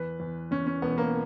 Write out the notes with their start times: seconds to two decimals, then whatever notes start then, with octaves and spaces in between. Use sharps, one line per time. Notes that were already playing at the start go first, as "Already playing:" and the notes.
Already playing: E2 B4
0.20 E2
0.51 E2 C#4
0.67 C#4
0.82 E1 B3
0.98 A#3